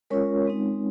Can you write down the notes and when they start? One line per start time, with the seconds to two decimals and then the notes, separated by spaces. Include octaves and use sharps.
0.10 G#3 C#4 F4 A#4 C#5
0.45 G#3 C4 D#4